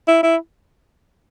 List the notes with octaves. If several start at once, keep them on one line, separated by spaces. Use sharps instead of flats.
E4
E4